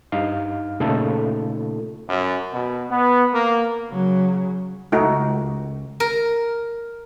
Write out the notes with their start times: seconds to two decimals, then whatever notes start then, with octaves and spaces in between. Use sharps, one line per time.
0.12 G2 D#4 F5 F6
0.80 A#2 C#3 A3 D#4 F4 A4
2.08 F#2
2.51 B2
2.89 B3
3.32 A#3
3.90 C#3 F#3
4.92 C#2 A3 D#4 F#4
6.00 A#4